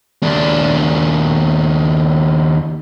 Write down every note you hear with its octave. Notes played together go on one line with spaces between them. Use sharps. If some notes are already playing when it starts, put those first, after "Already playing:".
D#2 D4